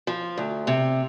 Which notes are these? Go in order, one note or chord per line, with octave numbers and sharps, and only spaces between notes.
F3
D2
C3